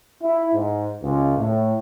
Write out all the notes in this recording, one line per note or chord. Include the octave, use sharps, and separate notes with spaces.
E4
G#2
C#2
A2